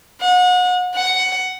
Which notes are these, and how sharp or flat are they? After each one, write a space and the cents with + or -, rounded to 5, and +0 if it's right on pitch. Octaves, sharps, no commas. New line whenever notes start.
F#5 -35
F#5 +10